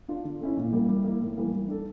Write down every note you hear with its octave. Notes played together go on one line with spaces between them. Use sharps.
D4 F4
D3
A3 C#4 E4
A#2
G3 A#3 E4
G3
A#3 E4
A2
E3 G3 A#3
G3
D4 A4